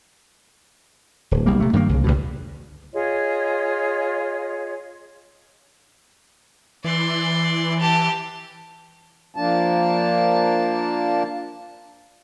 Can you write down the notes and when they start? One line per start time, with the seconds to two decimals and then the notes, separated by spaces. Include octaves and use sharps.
1.31 D1
1.46 B1 G3 A#3
1.60 C3 A3
1.73 G2 D#3 G#3 A#3
1.89 C2 C#3
2.04 C#2 G2 B2
2.92 F4 G#4 C#5 D#5
6.84 E3 D5 C6
7.80 G4 A5
9.36 F3 A#3 D4 A5